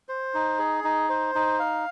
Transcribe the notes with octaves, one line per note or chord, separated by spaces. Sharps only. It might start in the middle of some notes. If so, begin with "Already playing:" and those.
C5
D#4
G#4
D#4
C5
D#4
F5